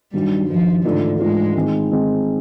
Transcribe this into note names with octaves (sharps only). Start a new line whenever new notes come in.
G2 D#3 F#3 G3
G2 D#3 F3 F#3
G#2 D3 E3 A3 D4 F4
G#2 E3 G#3 A3 D4 F4
D#3 G#3 C4 D#4
D#3 G#3 C4 D#4